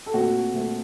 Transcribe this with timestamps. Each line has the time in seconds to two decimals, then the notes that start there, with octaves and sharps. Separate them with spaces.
0.06 A4
0.14 A#2 A3 C4 F#4
0.54 A#2 A3 C4